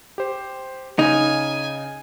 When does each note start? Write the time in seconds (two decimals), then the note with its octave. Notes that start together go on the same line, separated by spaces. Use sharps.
0.18 G4 C5
0.99 C#3 D#4 G#5